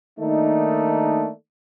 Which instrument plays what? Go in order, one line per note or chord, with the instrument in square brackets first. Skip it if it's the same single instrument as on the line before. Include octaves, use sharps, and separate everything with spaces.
[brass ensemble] D#3 A3 A#3 D4 D#4